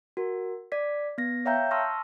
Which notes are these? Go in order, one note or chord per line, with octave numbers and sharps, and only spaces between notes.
F#4 A#4
D5 B6
B3 A#6
C#5 E5 F5 G5 A#5 G6
A5 C6 C#6 E6 F6 A#6